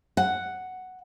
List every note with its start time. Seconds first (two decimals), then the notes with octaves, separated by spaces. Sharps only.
0.17 F#5